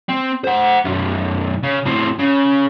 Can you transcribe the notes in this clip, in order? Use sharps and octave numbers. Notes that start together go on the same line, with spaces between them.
C4
C5 F#5
B1 F#2
C#3
A2 C4
C#3